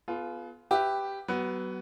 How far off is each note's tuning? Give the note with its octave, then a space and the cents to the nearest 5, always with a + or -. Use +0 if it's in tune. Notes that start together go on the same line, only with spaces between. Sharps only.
B3 +5 F4 +0 G#4 +45
G4 +0 B4 +15 E5 +0
F#3 +30 B3 +0